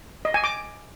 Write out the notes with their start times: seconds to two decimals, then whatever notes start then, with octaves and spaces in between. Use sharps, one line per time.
0.25 D#5
0.34 G#5
0.44 D6